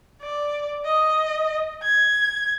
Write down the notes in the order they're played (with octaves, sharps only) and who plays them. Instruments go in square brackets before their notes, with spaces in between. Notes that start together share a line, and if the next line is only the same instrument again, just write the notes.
[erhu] D5
D#5
G#6